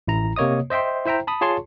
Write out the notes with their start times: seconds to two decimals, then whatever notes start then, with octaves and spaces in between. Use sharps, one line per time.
0.08 A1 E4 A#5
0.36 C3 A#3 C#5 D#5 D#6
0.70 C5 D#5 E5 G5 C6
1.05 E4 C5 E5 G5 A#5
1.27 A5 B5 D#6
1.41 F4 G#4 C#5 A5 C6 C#6